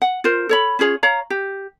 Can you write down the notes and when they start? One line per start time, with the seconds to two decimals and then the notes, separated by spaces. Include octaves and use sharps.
0.02 F#5
0.24 F4 A#4 C5
0.49 A4 C#5 B5
0.79 C#4 F4 G#4 C#5
1.03 C#5 F5 A#5
1.30 G4